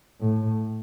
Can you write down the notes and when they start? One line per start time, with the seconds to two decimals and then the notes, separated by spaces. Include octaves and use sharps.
0.21 A2